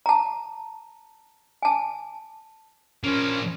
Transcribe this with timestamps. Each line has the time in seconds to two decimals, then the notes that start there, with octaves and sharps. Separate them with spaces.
0.06 A5 A#5
1.63 G#5 A5
3.04 F3 A#3 C#4